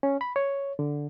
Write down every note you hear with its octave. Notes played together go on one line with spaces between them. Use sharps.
C#4
B5
C#5
D3